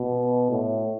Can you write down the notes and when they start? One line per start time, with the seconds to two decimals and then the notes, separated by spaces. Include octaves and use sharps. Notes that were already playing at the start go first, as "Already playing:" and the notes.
Already playing: B2
0.50 A2